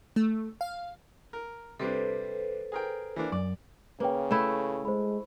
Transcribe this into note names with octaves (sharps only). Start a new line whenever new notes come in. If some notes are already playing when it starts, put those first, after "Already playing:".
A3
F5
A#4
C3 G3 D4 A4 B4 C5
G#4 A#4 G5
E3 A#3 D4
F#2 D5
C#3 A#3 B4 C#5 G5
A3 E4
G#3 C5 B5